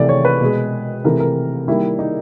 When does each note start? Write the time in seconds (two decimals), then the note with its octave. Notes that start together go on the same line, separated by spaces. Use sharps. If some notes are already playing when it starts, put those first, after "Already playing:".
Already playing: C3 E3 A3 D5
0.09 C#5
0.25 B4
0.40 B2 G#3
1.04 C3 E3 A3 A#4
1.20 A#4
1.67 D#3 G3 A#3 E4
1.99 D#4